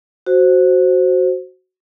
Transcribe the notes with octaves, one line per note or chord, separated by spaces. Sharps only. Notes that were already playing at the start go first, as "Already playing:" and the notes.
F#4 C5